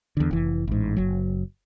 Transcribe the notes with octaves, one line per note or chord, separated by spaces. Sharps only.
E2 D3
F1 E3
A1 G#2
F#1 F#3